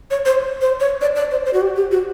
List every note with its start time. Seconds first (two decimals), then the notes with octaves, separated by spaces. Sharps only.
0.11 C#5
0.26 C5
0.61 C5
0.80 C#5
1.01 D5
1.15 D5
1.31 C5
1.46 C5
1.53 F#4
1.61 G4
1.76 G4
1.91 F#4